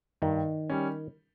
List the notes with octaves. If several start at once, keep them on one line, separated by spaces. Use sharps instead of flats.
G2 D#3
G3 C#4